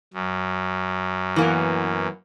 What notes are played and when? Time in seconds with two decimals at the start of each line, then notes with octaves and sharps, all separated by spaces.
0.14 F#2
1.36 E3 A#3 B3